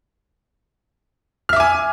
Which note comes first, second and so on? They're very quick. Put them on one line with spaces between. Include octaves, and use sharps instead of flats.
F6 E5 D6 G#5